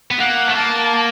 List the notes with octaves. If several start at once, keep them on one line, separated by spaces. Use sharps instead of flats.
B3
A#3 F#5
A3
A#3 A5